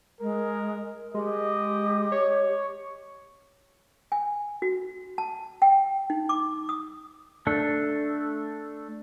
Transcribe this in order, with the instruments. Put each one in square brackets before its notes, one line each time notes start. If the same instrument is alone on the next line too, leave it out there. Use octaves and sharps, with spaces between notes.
[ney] G#3 [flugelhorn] A#4
[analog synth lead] G#3 [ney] G4 [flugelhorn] D#5
[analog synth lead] C#5
[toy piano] G#5
F#4
A5
G5
D#4
D6
D#6
[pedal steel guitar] A3 D4 A4